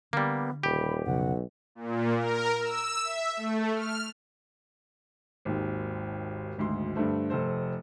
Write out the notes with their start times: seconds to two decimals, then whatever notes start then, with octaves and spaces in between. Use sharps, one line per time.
0.13 D3 G3 A#3 B3
0.63 D#1 G4 B5
1.06 B1 F2 C#3 F#5
1.75 A#2
2.16 A#4
2.60 E6
3.03 E5
3.37 A3
3.75 F6
5.45 G#1 D#2
6.58 G#1 D2 G#3 C6
6.95 G2 D3 A3 C5
7.30 F1 A4 C5